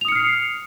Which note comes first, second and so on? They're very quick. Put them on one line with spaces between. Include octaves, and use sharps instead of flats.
F7 D#6 C#7 F6 C7